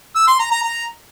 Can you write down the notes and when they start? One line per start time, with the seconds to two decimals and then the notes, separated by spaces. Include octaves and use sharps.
0.15 E6
0.27 C6
0.39 A#5
0.51 A#5
0.63 A#5